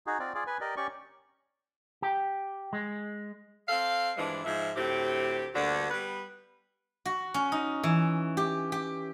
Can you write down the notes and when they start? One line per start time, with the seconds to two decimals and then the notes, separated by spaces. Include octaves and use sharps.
0.07 D#4 F#4 G#4
0.19 C4 F4 D5
0.34 F4 G#4 D5
0.47 B4 G#5
0.61 G4 A#4 D5 D#5
0.77 C#4 G4 D5 C#6
2.02 G4
2.73 G#3
3.68 C4 A4 F5
4.17 G2 E3 F3 G#3 D4
4.44 G#2 F3 G#3 E5
4.76 D2 A2 C4 G4
5.54 D2 G2 D3 A#3 F#4
5.90 G3 B3 B4
7.05 F#4
7.34 C#4
7.52 D#4
7.83 E3
8.37 G4
8.72 G4